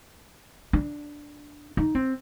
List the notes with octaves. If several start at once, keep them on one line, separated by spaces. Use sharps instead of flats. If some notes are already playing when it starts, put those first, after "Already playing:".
D4
D#4
C4